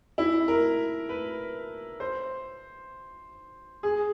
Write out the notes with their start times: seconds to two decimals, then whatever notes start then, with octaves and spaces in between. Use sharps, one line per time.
0.18 E4
0.48 A#4
1.09 B4
2.00 C5
3.83 G#4